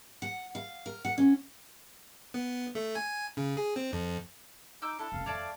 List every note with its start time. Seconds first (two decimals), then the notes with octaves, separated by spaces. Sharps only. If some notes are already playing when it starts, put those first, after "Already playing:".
0.22 F#5
0.55 F5
0.86 A#4
1.05 F#5
1.18 C#4
2.34 B3
2.75 A3
2.95 G#5
3.37 C#3
3.57 G#4
3.76 C4
3.93 F2
4.82 D#4 D6 E6 G6
4.99 D4 E4 A4
5.12 F1 C#2 F5
5.26 F2 A3 C#5 D5 F5 A5 D6